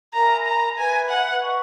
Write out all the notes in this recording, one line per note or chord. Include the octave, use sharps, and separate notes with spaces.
A#4 E5 G#5 A#5 B5
A#5
B4 E5 G#5 B5
F#5
B4 D#5 F#5 C#6